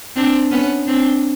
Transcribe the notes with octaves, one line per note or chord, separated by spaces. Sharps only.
C4 D4
B3 C#4
C4 D4